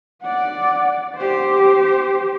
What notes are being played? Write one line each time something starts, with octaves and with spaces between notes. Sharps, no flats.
D5 F#5
G4 C5